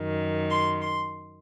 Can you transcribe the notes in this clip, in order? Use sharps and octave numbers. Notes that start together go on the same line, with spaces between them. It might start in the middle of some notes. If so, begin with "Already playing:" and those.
Already playing: F#2 D#3
C6
C6